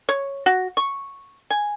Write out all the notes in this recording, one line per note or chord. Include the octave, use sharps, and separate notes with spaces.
C#5
F#4
C#6
G#5